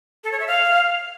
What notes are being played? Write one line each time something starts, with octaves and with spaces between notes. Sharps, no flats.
A4
C#5
E5
F5